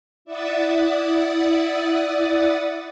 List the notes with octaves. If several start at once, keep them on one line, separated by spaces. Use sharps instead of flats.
E4 D5 E5 F#5 D#6 A6